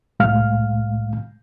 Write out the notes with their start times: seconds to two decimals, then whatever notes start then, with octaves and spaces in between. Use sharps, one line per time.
0.20 C2 A2 G#3 F5 F6